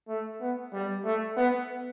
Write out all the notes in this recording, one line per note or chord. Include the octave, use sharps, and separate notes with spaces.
A3
B3
G3
A3
B3